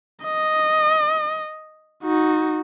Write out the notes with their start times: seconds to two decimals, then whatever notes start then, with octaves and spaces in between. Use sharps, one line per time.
0.24 D#5
2.04 D#4 F#4